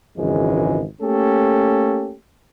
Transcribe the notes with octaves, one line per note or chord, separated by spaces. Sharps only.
G#1 C#2 F#2 E3 G#3
A3 A#3 C#4 G4 A4